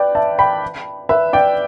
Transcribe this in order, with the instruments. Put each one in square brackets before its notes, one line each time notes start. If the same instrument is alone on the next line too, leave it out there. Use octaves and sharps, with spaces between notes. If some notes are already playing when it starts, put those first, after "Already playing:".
Already playing: [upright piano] B4 D5 G5
E5 A5
G5 B5
B4 E5
D5 G5